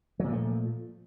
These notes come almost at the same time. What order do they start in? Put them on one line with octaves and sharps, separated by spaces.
F#3 A#2 F3 A3